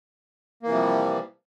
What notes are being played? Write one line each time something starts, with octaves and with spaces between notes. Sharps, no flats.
C3 E3 F3 G3 A#3